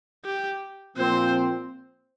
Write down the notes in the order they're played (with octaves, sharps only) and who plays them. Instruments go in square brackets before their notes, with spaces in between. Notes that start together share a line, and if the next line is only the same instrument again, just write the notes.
[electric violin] G4
[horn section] A#2 F3 C4 [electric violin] C5